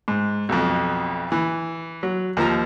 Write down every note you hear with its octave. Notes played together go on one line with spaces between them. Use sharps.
G#2
B1 F2
E3
F#3
D#2 F3 A#5